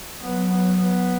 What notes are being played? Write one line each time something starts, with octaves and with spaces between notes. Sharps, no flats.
F#3 B3
B3
B3